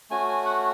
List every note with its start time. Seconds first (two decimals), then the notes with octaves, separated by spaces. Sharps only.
0.10 A3 C#4 F#4 G#5
0.28 G#5
0.45 F#5